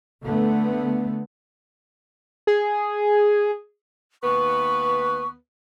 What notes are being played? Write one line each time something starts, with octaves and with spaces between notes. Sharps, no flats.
D3 A3 B3
G#4
D#2 B3 B4 C#6